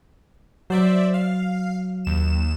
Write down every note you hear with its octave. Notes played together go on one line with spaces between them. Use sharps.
F#3 C5 D5 E5
F5
D#2 E7